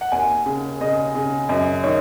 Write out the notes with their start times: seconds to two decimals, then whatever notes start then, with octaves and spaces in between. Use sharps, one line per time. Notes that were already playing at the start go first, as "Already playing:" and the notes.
0.01 F#5
0.12 D#2 G#5
0.46 C#3
0.81 C#3 D#5
1.15 C#3
1.49 F#2 D#5
1.84 D#3 C#5